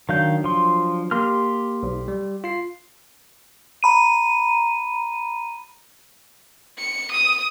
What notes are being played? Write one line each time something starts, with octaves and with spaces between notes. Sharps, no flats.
D#3 F#3 D4 F5 G6
F3 C6
A#3 G4 C6 F6
B1
G3
F4 C7
A#5 B5 D#7
C#7
D#6